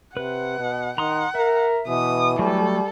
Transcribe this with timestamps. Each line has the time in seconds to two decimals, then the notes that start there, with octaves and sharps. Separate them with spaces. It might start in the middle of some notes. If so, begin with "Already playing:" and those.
0.17 C3 B4 F#5
0.58 B2
0.98 D#3 F#5 A#5 C6 D#6
1.35 A#4 E5
1.88 B2 E3 D#6
2.39 F#3 G3 A3 A4